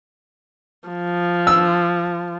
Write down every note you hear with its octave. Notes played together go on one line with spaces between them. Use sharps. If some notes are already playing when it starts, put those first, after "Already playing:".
F3
E6